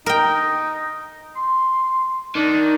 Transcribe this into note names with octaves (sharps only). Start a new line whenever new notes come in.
D#4 A#4 G5
C6
D#3 D4